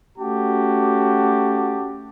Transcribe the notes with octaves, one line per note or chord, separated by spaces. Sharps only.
A3 C#4 F#4 G4 A5